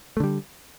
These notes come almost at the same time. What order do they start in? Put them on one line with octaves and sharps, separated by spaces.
A3 D3 G3